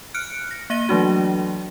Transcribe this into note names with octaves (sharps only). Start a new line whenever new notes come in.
F6 F#6 C#7 D7
A#6
A#3 E5 A#6 D#7 G7
E3 F#3 A3 D4 F#4